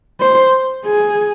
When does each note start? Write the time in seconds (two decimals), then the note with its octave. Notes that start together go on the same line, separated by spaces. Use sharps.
0.21 C5
0.86 G#4